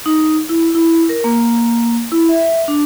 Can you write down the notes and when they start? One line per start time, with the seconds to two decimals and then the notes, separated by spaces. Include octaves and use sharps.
0.06 D#4
0.49 E4
0.75 E4
1.09 A#4
1.24 A#3
2.12 E4
2.29 E5
2.68 D4